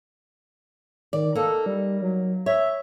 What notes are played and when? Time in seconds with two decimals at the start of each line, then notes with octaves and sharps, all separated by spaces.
1.13 D#3 D5
1.35 A#3 D#4 A4
1.66 G3
2.02 F#3
2.46 C#5 E5